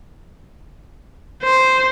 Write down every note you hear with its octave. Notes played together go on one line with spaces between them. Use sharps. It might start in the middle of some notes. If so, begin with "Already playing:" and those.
C5